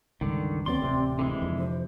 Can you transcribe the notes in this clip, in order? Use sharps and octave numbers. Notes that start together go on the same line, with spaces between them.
C#2 G2 D3 D#3
D#2 F#3 B3 C4 D5 C6
D1 A1 C3
D3 E3 G#3
F2 C3
C5